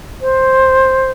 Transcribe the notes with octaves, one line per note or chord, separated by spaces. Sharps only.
C5